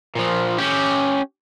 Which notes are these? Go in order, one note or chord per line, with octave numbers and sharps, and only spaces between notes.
A#2 F3
C#4 G4